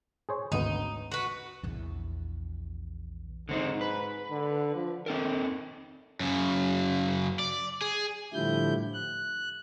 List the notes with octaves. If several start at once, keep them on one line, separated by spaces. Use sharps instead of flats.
G#4 C5 C#5
G#1 D2 B3 D#4
F#4 B4
A#1 E2
G#2 D3 C4 D#4
B4
D3
F3
D#3 C4 A4 A#4
F#2 C#3
D5
G#4
A2 D3 F3 G3 E4 G6
F#6